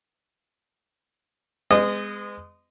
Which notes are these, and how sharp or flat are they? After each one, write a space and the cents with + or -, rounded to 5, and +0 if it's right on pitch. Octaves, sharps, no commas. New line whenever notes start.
G#3 -15 B3 +40 D#5 -20